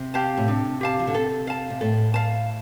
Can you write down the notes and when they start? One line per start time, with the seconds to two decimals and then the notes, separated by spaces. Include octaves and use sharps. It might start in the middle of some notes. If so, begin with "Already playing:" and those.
Already playing: C3
0.14 G4 F5 A5
0.37 A2
0.48 C3 D4
0.81 G4 F5 A5
0.99 F3
1.07 D3
1.14 C3 A4
1.47 F5 A5
1.70 C3
1.81 A2 A4
2.14 F5 A5